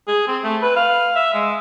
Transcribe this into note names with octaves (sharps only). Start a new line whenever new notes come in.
G#4
C4
A3
B4
F5
E5
G#3